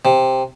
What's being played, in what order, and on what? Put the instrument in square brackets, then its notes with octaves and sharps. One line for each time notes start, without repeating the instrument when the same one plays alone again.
[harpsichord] C3